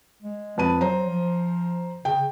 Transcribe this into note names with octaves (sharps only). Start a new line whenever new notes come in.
G#3
F2 B4 A5 D#7
F#3 C5 A#5
F3
C#3 G5